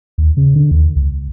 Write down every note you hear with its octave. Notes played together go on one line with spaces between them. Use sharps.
D#2
C#3
D3
D#2
C#2